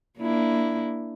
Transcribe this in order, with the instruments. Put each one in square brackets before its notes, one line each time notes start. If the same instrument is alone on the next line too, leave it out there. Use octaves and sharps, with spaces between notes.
[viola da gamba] A#3 D4 E4